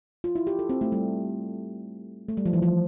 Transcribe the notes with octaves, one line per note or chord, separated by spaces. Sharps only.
F4
E4
G4
A4
C4
A3
G3
A3
G3
F3
E3
F3